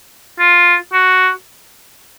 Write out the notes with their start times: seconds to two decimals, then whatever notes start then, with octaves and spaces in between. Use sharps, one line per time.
0.39 F4
0.93 F#4